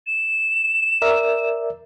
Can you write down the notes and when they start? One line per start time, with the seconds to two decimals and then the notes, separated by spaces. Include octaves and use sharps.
0.07 E7
1.02 A#4 D5 E5